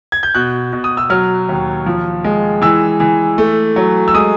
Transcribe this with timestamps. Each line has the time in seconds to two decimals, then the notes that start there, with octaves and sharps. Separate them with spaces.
0.12 G#6
0.23 G6
0.35 B2 F#6
0.73 B2
0.84 D#6
0.97 E6
1.10 F#3 F6
1.49 D#2
1.86 F3
2.24 G#3
2.62 E3 E6
3.00 E3
3.38 A3
3.76 F#3
4.08 E6
4.14 G#3 D#6